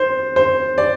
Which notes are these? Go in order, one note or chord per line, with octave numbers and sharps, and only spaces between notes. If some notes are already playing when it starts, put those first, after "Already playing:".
Already playing: C5
C5
D5